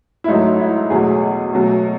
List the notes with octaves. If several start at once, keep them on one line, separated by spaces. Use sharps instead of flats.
E4
G#2 F#3 A3 D#4
E4
E2 B2 F#3 A3 G#4
B2 F#3 A3